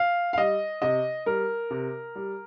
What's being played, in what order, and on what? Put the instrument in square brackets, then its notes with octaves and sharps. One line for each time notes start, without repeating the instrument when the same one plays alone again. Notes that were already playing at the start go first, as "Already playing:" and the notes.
Already playing: [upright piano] F5
F5
G3 D#5
C3 D#5
G3 A#4
C3
G3